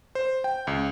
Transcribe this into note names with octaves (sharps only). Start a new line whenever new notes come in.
C5
G5
C#2